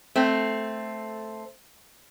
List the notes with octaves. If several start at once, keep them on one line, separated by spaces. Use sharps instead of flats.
A3 C4